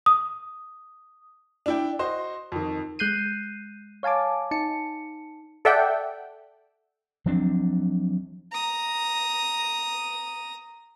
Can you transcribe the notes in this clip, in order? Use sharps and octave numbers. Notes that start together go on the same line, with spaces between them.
D#6
D4 E4 G5
F#4 C5 D#5
F2 D#3
G#3 F#6 G6 C7 D#7
C#5 F5 G#5 A5 D6
D#4 A5 C#7
A4 D5 E5 F#5 G5
F3 F#3 C4 D4
A#5 D#6